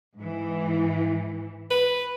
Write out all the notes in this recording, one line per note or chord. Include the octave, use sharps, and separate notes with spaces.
G#2 E3
B4